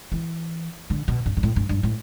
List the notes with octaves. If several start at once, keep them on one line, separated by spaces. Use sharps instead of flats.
E3
D3
B2
G2
G2
A2
G2
G2
A2